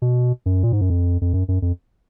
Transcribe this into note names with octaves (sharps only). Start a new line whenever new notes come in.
B2
F#2
A#2
G#2
F#2
F2
F2
F#2
F#2
F2